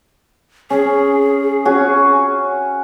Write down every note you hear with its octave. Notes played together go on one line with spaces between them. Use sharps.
C#4 G#4
C#4 F#4